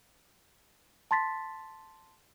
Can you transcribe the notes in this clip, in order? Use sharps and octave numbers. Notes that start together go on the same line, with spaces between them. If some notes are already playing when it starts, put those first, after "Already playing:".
A5 C6 A6 B6